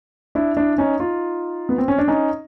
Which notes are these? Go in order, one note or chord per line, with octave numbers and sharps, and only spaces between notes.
D4 E4
D4 E4
C#4 D#4
D#4 F4
B3
C4
C#4
D4
C#4 D#4